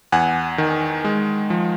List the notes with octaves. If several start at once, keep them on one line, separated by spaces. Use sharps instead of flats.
E2 F#5 G#5
D#3
G#3
F3